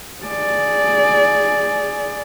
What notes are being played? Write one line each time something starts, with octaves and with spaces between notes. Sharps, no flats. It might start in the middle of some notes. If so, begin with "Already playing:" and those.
G#4 D5